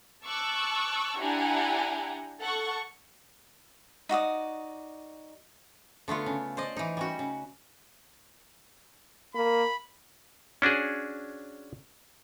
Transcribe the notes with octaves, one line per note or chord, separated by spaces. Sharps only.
A5 C#6 D6 E6 F#6
D4 E4 G4 F#5 G#5 A#5
A4 F#5 C#6
D#4 F#4 D5 D#6
D3 A3 B3 F4
C#3
C5 D5 D#5
E3 D#4
G3 C#4 F#4
C#3
A#3 B5
C#4 D4 F#4 G#4